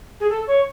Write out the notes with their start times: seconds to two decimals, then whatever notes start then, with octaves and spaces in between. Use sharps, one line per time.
0.20 G#4
0.29 A4
0.47 C#5